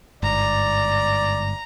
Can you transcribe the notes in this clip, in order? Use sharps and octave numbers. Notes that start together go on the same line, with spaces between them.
G1 G#2 D5 A#5